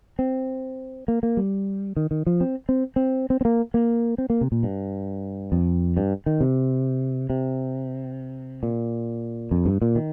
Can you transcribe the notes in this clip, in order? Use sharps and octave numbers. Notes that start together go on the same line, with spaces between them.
C4
A#3
A#3
G3
D#3
D#3
F3
C4
C4
C4
C4
C4
A#3
A#3
C4
A#3
C3
A#2
G2
F2
G2
D#3
C3
C3
A#2
F2
G2
A#2
D#3